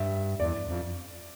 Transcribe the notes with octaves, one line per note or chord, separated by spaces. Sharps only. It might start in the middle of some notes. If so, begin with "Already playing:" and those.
Already playing: G2 E5
E2 D5
F2